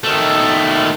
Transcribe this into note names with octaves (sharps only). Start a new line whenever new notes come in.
D#3 A3